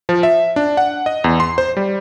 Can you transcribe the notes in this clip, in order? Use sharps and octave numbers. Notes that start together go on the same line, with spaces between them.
F3
E5
D4
F#5
D#5
E2
C6
C5
G3